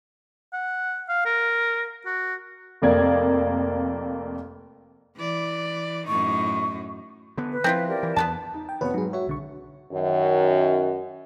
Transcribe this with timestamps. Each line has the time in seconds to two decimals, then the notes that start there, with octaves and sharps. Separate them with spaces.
0.53 F#5
1.09 F5
1.26 A#4
2.06 F#4
2.82 F1 F2 A#3 D5 G#6
5.17 E3 D5
6.07 F#2 A2 D#4 C#6
7.37 D3 B3
7.53 B4
7.64 F3 C4 E4 F4
7.87 G4 A#4 D5
8.03 E3
8.16 E2 B3 D4 A5
8.54 D#4
8.69 G5
8.81 F1 B3 B4 C#5 F#5
8.94 G#2 F#3 G#4
9.13 F#4 C#5 E5
9.27 B1 D3 C#6
9.93 F#2 D#3